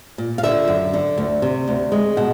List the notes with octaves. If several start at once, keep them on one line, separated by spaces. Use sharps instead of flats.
A#2
F5
D3 E5
F#2
D3
D2
C3
D2
G#3
B2 F#5